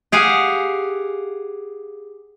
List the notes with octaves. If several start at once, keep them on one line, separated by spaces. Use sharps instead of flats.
G4 G#4 F5 F#5